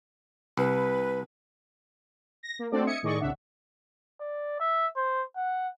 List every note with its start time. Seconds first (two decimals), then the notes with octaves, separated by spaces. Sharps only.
0.57 C2 B4
2.43 A#6
2.59 A#3
2.72 A3 C4 D4 F#4 A4 D5
2.86 D#5 E5 D#6 G#6 C#7
3.03 A2 D#3 G#4 D5 D#5 C#6
3.20 C2 C#3 D4 E5 F#5
4.20 D5
4.60 E5
4.96 C5
5.36 F#5